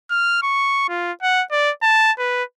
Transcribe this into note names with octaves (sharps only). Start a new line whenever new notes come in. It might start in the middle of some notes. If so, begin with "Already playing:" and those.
F6
C#6
F4
F#5
D5
A5
B4